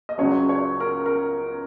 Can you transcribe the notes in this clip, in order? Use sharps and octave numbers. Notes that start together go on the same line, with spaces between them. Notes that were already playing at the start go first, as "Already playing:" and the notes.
D#5
C#2 C#3 F#3 C#5
C#5
A#4
A#4